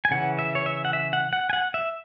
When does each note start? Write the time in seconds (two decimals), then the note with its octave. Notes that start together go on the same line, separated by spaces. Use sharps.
0.05 G#5
0.11 C#3 E3 C#4 F#5
0.39 E5
0.55 C#5
0.66 E5
0.85 F#5
0.93 E5
1.13 F#5
1.33 F#5
1.50 G#5
1.53 F#5
1.74 E5